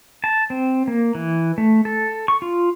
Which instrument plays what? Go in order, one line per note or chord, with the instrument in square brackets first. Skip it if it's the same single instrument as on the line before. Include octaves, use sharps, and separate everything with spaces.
[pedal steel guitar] A5
C4
A#3
E3
A3
A4
C#6
F4